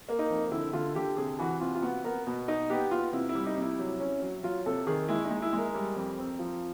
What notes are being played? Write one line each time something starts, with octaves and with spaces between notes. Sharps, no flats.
A#3
D#4
F2
D3 E4
D3 F4
D3 G4
C3 G#4
E3 F#4
C3 F4
F4
B3 F#4
B3 A#4
B2
D#4
B3 G4
B3 F4
C3 E4
E4
G3
D#4
C3
E4
F#3
C#4
F#3
F#3 F4
C3 A4
D#3 G#4
G#3 E4
D#4
G#3
E4
G#3 A#4
G3
F2
C4
F3